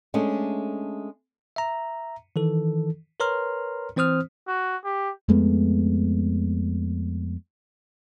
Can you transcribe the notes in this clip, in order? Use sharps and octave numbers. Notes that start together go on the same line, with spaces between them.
G#3 A3 C#4 D4
E5 A#5
D#3 E3 A4
A#4 B4 C#5 A#5 C6 F6
E3 C4 C5 D#6 F6
F#4
G4
F2 G#3 A3 B3